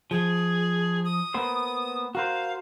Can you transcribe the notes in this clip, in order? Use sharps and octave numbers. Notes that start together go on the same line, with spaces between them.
F3 G#4
D#6
A#3 B3 C5
F#4 A#4 C5 F5